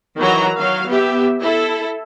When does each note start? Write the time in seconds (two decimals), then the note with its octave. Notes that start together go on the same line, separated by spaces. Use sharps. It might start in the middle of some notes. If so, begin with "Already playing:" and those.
0.17 D#3 E3 F#3 F#4 A#5
0.56 F#3 F5
0.88 B3 G4 E5
1.41 E4 A4